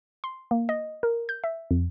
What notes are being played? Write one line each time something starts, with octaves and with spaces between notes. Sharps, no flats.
C6
A#3
D#5
A#4
G6
E5
F2